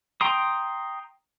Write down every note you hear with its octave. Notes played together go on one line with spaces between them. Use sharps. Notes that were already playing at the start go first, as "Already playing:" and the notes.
G5 A#5 C6 D#6